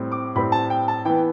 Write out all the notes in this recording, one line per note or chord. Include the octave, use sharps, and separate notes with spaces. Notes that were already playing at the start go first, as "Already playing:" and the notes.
Already playing: A2 G3 C4
D6
A2 G3 C4 B5
A5
G5
A5
E3 B3 G5